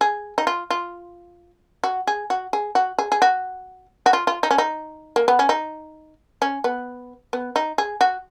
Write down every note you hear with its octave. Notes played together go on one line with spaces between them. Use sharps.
G#4
D#4
F4
F4
F#4
G#4
F#4
G#4
F#4
G#4
G#4
F#4
F#4
F4
F4
D#4
C#4
D#4
A#3
B3
C#4
D#4
C#4
B3
B3
D#4
G#4
F#4